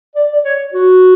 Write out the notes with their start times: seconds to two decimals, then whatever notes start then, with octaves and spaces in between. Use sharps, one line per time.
0.15 D5
0.33 D5
0.44 C#5
0.74 F#4